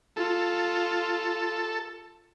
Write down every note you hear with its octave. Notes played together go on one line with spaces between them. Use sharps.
F4 A4